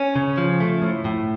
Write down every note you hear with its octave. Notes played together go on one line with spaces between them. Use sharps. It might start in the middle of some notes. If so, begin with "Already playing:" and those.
Already playing: C#4
C#3
F3
A3
A2
A2